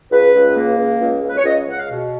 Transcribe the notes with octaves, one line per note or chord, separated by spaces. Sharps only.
C#2 B4
C#2
A#3
C#2
C#2
C#2
B4
C#5
C#2 D#5
C#2 F#5
F5
B2